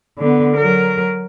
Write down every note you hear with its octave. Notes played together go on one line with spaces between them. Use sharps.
D3 B3
F#3 A#4